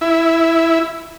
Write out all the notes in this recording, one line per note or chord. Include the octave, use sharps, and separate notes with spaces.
E4